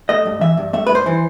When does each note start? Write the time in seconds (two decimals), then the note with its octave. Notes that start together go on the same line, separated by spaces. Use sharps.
0.09 A3 D#5
0.26 G2
0.41 E3 E5
0.57 G2
0.73 A3 E5
0.87 B4
0.89 G2
0.95 C5
1.06 E3